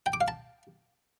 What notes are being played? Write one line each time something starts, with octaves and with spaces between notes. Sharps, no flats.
G5
D6
F5
A5